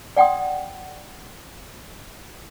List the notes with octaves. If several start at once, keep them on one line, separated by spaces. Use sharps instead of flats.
D5 F#5 G5 C6 D#6